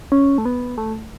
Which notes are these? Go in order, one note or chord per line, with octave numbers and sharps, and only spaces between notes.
C#4
A3
B3
A3